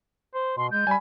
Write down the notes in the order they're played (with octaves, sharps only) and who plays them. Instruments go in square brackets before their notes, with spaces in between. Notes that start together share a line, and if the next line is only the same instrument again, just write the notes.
[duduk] C5
[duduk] B2 [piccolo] C6
[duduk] G#3 [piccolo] G6
[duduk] G3 [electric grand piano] G#5 B5